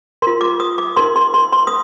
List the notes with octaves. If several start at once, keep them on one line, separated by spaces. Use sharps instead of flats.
F4 A#4 C6
D6
D#6
D6
D#4 A#4 C6
C6
C6
C6
D#6